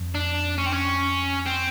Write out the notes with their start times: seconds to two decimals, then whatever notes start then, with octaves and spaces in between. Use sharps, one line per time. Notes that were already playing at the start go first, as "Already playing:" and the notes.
Already playing: F2
0.15 D4
0.58 C#4
0.66 C4
0.72 C#4
1.46 C4